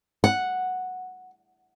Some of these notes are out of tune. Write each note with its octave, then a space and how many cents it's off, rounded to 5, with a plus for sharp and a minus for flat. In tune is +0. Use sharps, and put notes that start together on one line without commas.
F#5 -5